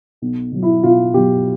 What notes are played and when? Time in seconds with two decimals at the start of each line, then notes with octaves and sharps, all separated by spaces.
0.22 B1
0.52 B2 F#3
0.63 E4
0.83 B1 F4
1.14 B2 F#3 G4